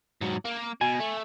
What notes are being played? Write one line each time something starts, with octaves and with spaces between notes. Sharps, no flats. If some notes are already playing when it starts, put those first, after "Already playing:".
G#2 F#3
A#3
B2 G#5
A3